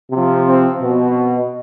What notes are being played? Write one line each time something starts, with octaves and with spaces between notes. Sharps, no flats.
C3 F3
C4
B2